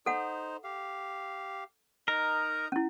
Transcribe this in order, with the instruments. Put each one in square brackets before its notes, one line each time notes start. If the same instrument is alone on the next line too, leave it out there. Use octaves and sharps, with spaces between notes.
[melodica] D#4 C5 [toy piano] A4 F#5
[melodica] G4 F5
[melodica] D#4 D#5 A#5 [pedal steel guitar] A#4
[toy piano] C#4 E4